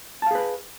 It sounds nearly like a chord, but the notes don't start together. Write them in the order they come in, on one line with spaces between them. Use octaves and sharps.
A5 F5 G#4 B4